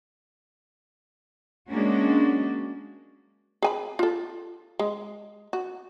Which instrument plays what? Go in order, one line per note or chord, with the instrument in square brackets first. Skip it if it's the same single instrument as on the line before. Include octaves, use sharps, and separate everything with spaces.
[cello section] F#3 G#3 A#3 C#4 D4 F#4
[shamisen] G#4 G#5 B5
F4 A4
G#3
F#4